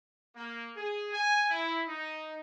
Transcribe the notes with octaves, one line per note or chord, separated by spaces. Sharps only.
A#3
G#4
G#5
E4
D#4